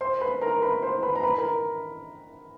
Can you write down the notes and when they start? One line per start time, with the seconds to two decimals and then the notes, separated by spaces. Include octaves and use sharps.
0.01 C5 C6
0.21 B4 B5
0.42 A#4 A#5
0.62 B4 B5
0.82 C5 C6
1.03 B4 B5
1.15 A#5
1.23 B4 B5
1.38 A#4 A#5